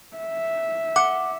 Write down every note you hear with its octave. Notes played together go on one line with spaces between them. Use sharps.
E5
F#5 D6